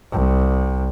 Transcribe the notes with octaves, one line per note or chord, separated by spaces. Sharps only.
C2